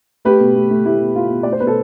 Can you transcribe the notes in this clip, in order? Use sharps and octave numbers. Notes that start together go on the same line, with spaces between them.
A3 G4 B4
B2
A3
A3
A3 E4 G4
B2
B2 F4
B2
A3 D5
C5
B2 B4
A4